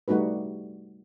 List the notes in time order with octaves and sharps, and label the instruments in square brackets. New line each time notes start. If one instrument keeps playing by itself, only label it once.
[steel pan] G3 A3 D#4 F#4 B4